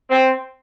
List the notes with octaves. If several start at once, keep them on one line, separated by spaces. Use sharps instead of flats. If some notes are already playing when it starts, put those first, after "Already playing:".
C4